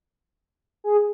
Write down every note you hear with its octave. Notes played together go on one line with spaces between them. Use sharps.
G#4